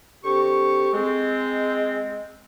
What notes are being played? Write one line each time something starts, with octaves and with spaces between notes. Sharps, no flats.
D3 C4 G4 C#6
G#3 C4